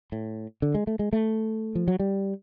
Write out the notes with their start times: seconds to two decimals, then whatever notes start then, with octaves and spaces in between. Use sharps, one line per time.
0.12 A2
0.62 D3
0.75 G#3
0.87 A3
0.99 G#3
1.13 A3
1.75 F3
1.88 F#3
2.00 G3